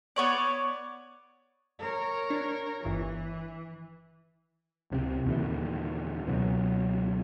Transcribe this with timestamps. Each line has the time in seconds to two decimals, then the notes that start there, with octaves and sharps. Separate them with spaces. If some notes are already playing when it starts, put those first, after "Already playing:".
0.16 B3 C#5 D5
1.80 A#4 C#5
2.30 D4
2.85 G1 E3
4.91 C#2 C3 F#3 C4
5.26 D#2 A#2 D3 E3
6.26 C#2 B2 F#3